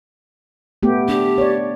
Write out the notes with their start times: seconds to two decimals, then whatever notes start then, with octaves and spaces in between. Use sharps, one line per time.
0.83 A3 B3 G4
1.09 D4 G4
1.38 C#5 D5